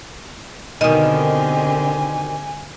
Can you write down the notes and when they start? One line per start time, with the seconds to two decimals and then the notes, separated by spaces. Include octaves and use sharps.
0.81 B2 D3 D#3 C4 G4 D#5 G#5